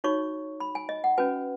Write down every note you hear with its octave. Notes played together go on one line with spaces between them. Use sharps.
D#4 F#4 C#5 C#6
B5
G#5
D#5
F#5
C#4 F#4 B4 G#5